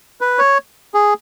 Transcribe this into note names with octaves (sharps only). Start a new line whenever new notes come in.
B4
C#5
G#4